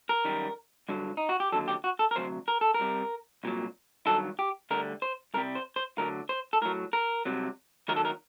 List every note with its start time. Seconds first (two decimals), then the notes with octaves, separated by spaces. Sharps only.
0.09 A#4
0.25 F#2 D#3 G3
0.89 G2 D3 F#3
1.17 D#4
1.29 F#4
1.40 G4
1.52 D#2 D3 F#3 A4
1.68 G4
1.84 F#4
1.99 A4
2.11 A#4
2.16 D2 C3 F#3 C5
2.48 A#4
2.61 A4
2.74 A#4
2.80 C2 C3 G3
3.44 C2 A#2 F#3
4.07 G2 D#3 F#3 A4
4.39 G4
4.71 D2 D3 G3 A#4
5.02 C5
5.34 C2 C3 G3 A#4
5.55 C5
5.76 C5
5.98 D2 D3 F#3 A#4
6.29 C5
6.53 A4
6.62 A2 F#3 A#4
6.93 A#4
7.25 C2 C3 F#3
7.88 D#2 D#3 F#3 A#4
7.96 A4
8.05 A#4